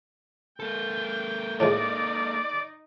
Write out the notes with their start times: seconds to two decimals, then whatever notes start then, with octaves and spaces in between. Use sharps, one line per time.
0.60 A#3 A4 G5
1.60 A2 F3 G#3 D#4 D5